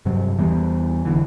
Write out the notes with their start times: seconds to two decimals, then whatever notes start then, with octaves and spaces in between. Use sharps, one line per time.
0.05 G2 C3 F#3
0.38 E2 E3 G3 B3
1.05 F1 D2 D3 E3